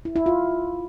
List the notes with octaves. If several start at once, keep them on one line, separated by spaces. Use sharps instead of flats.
E4
E4
F4